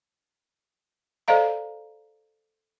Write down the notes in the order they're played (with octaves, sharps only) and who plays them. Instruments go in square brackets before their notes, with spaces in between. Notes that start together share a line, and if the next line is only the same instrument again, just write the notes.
[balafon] A4 C5 D5 D#5 F5 A#5